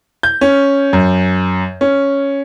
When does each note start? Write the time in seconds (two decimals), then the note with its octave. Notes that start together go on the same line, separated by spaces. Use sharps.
0.23 G6
0.41 C#4
0.93 F#2
1.81 C#4